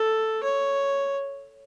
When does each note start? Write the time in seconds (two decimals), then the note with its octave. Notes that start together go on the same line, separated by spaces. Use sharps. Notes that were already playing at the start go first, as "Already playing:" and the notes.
Already playing: A4
0.44 C#5